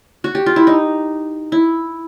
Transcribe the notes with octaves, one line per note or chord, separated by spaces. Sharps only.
F#4
G4
F4
E4
D#4
E4